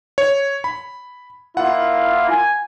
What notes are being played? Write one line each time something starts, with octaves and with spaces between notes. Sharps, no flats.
C#5
B5
A#3 E4 F4 F#5
G#5